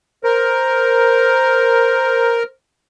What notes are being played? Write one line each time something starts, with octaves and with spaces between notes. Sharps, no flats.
A#4 C5